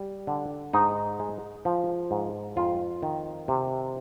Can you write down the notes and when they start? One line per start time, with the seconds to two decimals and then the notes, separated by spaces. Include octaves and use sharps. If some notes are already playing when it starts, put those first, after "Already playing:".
Already playing: G3
0.27 D3
0.73 G#2 D#4
1.20 G#3
1.65 F3
2.11 G#2
2.56 F2 F4
3.03 D#3
3.48 C3